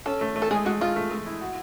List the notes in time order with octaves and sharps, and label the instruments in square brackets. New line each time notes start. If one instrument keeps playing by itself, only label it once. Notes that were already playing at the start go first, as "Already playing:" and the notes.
[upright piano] C#4 [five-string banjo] A4
[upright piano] A3
A3
[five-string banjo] A4
[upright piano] G#3 [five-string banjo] G#4
[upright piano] G#3 [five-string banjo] F#4
[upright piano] G#3 [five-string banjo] F4
[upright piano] A3
A3
E4
F#4